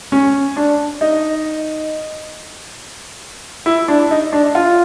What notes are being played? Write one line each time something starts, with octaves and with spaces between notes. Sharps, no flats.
C#4
D4
D#4
E4
D4
D#4
D4
F4